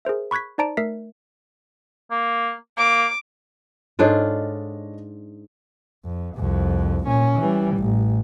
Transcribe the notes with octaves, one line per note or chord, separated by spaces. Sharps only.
G#4 A#4 C5 E5
B5 C#6 F#6 G#6 B6
D#4 C5 D5 A5 A#5 D7
A3 A#4 E5 B6 C7
A#3
A#3 D6
G#2 D4 F4 A4 C#5 D#5
F2
C2 F2
A#2 C#4
E3 G3
A1